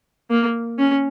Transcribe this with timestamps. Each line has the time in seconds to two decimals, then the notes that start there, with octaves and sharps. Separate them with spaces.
0.31 A#3
0.79 C#4